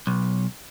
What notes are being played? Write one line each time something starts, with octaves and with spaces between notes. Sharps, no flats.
B1